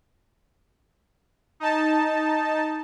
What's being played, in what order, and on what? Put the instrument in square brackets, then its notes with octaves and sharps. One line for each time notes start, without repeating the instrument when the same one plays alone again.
[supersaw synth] D#4 A5